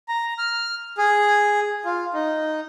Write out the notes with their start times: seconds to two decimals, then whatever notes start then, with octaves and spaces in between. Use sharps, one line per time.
0.08 A#5
0.38 F6
0.98 G#4
1.85 F4
2.14 D#4